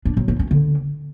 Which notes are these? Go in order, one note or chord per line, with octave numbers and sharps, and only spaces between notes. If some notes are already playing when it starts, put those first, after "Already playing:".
D4
F#3
D#4
C#4
D3